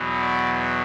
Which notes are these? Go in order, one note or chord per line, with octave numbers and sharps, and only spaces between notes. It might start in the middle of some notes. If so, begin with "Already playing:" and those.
Already playing: E2 B2 F#3
D5